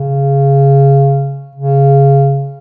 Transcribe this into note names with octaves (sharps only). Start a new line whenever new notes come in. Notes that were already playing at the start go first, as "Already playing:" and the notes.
Already playing: C#3
C#3